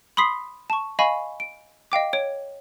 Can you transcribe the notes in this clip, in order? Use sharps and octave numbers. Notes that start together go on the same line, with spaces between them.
B5 C6 D#6 B6 C7
A5 C#6
D#5 F5 G#5 B5 C#6
D7
D#5 F5 G5 D6
C#5 D7